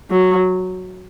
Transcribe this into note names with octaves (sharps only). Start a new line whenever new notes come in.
F#3